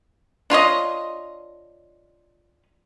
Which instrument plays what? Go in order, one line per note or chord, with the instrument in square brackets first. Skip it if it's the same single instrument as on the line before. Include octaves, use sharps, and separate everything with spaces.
[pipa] D4 F4 C#5 D#5